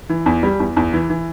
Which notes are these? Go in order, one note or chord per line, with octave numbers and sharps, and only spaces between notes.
E3
E2
G3
E2
E2
E3
E3